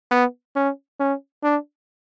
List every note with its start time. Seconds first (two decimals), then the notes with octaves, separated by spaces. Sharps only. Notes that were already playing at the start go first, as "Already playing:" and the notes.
0.11 B3
0.56 C#4
1.00 C#4
1.43 D4